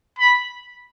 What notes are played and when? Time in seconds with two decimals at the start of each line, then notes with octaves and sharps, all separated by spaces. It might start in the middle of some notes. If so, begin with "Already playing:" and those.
0.19 B5